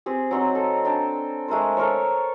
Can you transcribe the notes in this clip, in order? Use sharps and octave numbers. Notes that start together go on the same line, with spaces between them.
C4 G4 G#4
F#3 C4 D#4
A4
D4 G5 A5
G#3 A3 A#4 C5
A4 A#4 C5 C#5